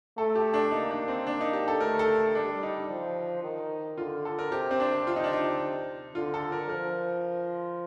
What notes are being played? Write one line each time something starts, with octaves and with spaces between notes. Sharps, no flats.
A3 A4
G4
D4
A#3 D#4
D4
C4
A#3 D4
D#4
G4
A4
A3 A#4
A4
G3 D4
D#4
F3
D#3
D3 F4
A4
A#4
C3 G4
C4
D4
F4
D#4
D4
D#4
D3 F4
A4
A#4
F3 A#4